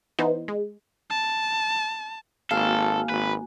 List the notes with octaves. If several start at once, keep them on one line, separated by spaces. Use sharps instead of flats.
E3 B3 D#4 C5
G#3
A5
G#1 A#3 F#4 A4 F5 G#5
G#1 B4